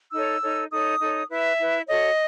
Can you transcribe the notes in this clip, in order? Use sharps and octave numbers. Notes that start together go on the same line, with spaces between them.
D#4 A4 C#5 E6
D#4 A4 C#5
D#4 A4 C#5 D#6
D#4 A4 C#5
E4 B4 E5
E4 B4
F#4 A4 C#5 D#5